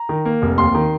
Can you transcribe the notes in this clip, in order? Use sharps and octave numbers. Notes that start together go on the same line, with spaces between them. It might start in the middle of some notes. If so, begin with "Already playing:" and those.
Already playing: A#5
D#3
A#3
F1
D#2 C6
D#3